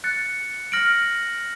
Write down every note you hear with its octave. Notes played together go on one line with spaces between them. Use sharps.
F#6 A6 C#7
F6 A#6 D7 F#7